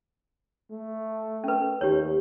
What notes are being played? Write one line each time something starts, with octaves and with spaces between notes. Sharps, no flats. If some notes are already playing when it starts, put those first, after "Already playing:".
A3
C#4 B4
D#2 G4 C#5